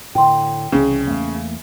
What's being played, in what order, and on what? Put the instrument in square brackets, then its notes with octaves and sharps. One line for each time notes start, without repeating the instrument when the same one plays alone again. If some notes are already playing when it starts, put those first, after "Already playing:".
[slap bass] A2 D3 [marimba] G5 C6
[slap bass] C2 E3 [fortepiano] C#3
[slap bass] E2 A3 A#3